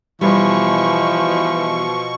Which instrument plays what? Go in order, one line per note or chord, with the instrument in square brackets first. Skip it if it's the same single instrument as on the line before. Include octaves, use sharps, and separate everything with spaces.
[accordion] B2 C#6 [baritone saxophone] E3 [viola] F3 [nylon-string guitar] G3